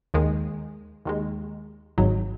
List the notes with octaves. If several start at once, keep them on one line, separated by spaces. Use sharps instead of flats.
D#2 D#3 G#3
D#2 D#3 G#3
G#1 G#2 F#3